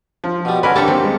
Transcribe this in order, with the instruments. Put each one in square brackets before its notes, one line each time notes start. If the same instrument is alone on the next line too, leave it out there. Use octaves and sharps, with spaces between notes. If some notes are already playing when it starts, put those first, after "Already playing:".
[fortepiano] F3
[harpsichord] B2 G3
[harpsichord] D3 [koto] C#4 A#4 [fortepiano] B4 G#5
[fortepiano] D3 [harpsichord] A#3 G4 A4 [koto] C#5 A5
[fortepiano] D#2 [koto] C4
[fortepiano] G#3